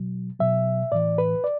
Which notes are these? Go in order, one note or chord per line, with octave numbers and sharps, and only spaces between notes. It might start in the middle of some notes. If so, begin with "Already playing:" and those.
Already playing: B2 F#3
B2 F#3 E5
A2 E3 D5
B4
D5